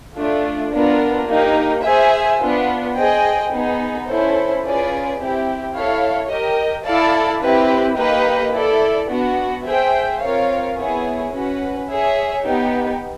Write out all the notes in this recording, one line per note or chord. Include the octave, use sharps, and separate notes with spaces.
A3 D4 F4
B3 D4 F4 A#4
A#3 D#4 G4 A#4
G#4 C5 E5 G#5
B3 D4 F4
G#4 C5 D#5 G5
B3 D#4 G#4
C#4 E4 A4 C5
C#4 F4 G#4 B4 D5
C4 E4 G4
E4 A4 C#5 F5
G4 A#4 D#5
E4 A4 D5 F5 A5
C4 E4 G4 B4
A#3 D#4 G4 B4 D#5
E4 A4 D5
B3 D4 F#4
G#4 C5 E5 G5
C4 F4 A#4 C#5 F5
B3 E4 G#4 C#5
C#4 F#4 B4
G#4 C#5 E5
B3 D#4 G4